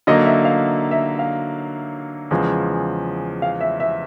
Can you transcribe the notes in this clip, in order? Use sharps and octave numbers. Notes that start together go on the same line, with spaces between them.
D3 F#3 A#3 D#4 D#5
E5
F5
E5
F5
E2 C#3 F3 G#3
F5
E5
E5